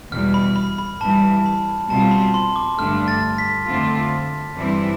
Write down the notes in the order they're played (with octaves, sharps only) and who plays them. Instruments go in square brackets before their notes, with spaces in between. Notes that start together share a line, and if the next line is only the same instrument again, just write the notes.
[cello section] E2 B2 G3 [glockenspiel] F6
[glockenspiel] B5
B5
B5
[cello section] G2 E3 G3 [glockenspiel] A5
[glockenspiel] B5
[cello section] B2 G3 C4 F4 [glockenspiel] A5
[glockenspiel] B5
C6
D6
[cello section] G2 D3 A3 D4 [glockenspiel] F6
[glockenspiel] A6
B6
[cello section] F2 D3 A3 C4 F4
G2 E3 G3 C4 E4